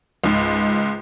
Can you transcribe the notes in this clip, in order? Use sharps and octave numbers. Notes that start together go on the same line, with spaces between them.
C#2 G#2